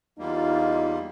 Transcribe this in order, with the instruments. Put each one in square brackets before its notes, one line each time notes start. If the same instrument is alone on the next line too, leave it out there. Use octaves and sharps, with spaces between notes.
[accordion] E2 G3 A#3 [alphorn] D#4 [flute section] F4